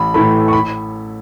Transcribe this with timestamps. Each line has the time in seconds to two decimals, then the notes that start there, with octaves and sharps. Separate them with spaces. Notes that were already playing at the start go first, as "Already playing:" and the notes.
Already playing: A1 B5
0.14 A2 E3 A3 B5
0.48 C#6
0.53 B5